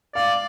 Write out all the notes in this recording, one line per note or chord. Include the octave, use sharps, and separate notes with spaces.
D5 F5